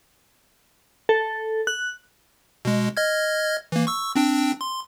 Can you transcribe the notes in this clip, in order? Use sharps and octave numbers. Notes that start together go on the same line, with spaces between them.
A4
F#6
B2 G#3
D#5 F6 G#6
E3 A#3
C#6 E6
C4 D4 G5
C6